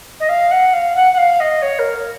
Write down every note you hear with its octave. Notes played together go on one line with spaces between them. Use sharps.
D#5
F5
F#5
F5
F#5
F#5
F5
D#5
C#5
A#4